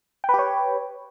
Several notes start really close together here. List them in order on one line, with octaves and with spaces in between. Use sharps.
G5 B4 G4 C#5